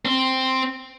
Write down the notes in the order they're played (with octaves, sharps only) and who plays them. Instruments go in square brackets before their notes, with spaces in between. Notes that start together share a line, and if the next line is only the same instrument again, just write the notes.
[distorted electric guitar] C4